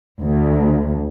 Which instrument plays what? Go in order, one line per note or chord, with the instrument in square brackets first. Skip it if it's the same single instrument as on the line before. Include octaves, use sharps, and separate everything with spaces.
[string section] D2